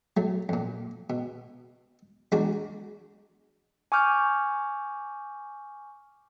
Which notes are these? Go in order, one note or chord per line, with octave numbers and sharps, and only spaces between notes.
F#3 A3
F2 A#2
B2
E2 G#3 D4 F#4 A#5
G#5 C#6 D6 F6 G6